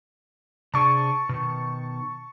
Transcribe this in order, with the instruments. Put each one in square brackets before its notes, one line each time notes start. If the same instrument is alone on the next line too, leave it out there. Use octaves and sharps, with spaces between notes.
[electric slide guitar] C3 D4 G#4 [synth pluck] A5 C#6
[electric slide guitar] B2 D#3